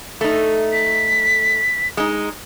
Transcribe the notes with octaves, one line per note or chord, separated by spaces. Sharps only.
A3 D#4
B6
G#3 D#4